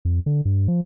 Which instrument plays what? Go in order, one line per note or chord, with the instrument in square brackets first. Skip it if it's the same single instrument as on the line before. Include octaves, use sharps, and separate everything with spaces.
[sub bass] F2
D3
G2
F3